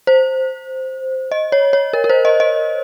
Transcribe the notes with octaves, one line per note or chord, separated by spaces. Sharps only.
C5
D#5
C#5
C#5
A#4
A#4
C5
D#5
D#5